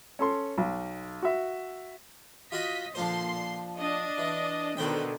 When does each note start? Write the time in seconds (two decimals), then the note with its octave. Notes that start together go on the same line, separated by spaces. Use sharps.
0.19 C#4 A4 C6
0.58 B1
1.22 F#4 E5
2.52 F4 F#4 D#5 C6 B6
2.95 A#2 D3 F3 C5 C6
3.77 D4 D#5
4.18 E3
4.77 B2 D3 D#3 B4 C5 G5